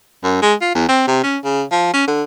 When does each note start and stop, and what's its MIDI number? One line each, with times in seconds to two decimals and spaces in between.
0.23 0.40 42
0.42 0.54 56
0.61 0.74 65
0.75 0.85 40
0.89 1.05 60
1.07 1.22 48
1.23 1.38 61
1.44 1.63 49
1.72 1.90 53
1.93 2.04 61
2.08 2.23 50